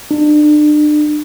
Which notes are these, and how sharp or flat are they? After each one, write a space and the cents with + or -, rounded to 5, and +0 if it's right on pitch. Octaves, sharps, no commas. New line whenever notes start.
D4 +35